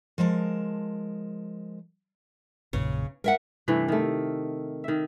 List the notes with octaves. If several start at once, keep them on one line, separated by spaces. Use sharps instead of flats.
F3 G#3 A#4 A5
A#1 F#2 A#2 C#3
G#3 A#4 E5 F#5
G2 C3 E3 A3
D#3 A3
D#3 E5